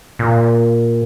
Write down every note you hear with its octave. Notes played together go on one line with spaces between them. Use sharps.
A#2